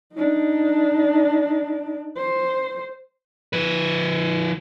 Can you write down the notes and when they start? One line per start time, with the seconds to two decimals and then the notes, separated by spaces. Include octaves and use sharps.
0.14 D4 D#4
2.16 C5
3.53 F3 B4